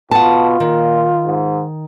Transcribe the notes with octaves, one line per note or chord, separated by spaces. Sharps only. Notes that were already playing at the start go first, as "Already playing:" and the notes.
B2 F4 F#5 A5
A#2 D#3
G#2